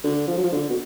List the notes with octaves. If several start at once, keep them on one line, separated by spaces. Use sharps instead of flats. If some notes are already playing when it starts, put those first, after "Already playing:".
D3
F3
F#3
F3
D3
B2